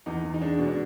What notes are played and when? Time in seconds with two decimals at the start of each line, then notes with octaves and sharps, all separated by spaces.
0.06 E2 D#4
0.24 E2
0.34 D#4
0.41 G#3 D4
0.59 B2
0.68 D4